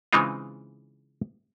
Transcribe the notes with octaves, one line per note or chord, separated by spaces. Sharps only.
C#3 E3 G#3 C4 D#4 F4